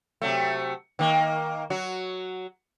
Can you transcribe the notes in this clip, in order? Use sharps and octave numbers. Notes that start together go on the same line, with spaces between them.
C3 F#3 A3
D#3 A#3
F#3 F#4